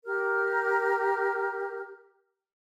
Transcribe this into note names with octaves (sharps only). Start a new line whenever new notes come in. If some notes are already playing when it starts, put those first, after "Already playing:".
G4 A#4 F6